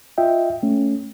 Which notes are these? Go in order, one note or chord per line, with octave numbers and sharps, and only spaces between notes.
F4 D#5 E5 G5
A3 C#4